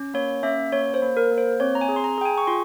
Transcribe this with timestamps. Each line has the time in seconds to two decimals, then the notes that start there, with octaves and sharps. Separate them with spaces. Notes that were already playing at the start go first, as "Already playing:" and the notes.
Already playing: C#4
0.14 A#3 C#5
0.43 C#4 E5
0.72 A#3 C#5
0.94 C5
1.02 A#3
1.17 A#4
1.31 A#3
1.38 C5
1.60 C4 C#5
1.75 A#5
1.81 G#5
1.89 G#4
1.96 C6
2.04 A#5
2.18 G#4 G5
2.25 G#5
2.38 C#6
2.47 F4 C6